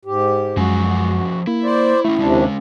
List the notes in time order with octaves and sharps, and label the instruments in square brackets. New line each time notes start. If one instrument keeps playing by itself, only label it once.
[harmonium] G#2 G4
[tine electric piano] F#2 G#3 [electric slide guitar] F3 C#4 G#5 [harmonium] F#4
[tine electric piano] A#3 [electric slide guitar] E4
[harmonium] C5 D5
[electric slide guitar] A3 C#4 [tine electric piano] E4
[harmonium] D#2 C3 D4 [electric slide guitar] G#3 C#4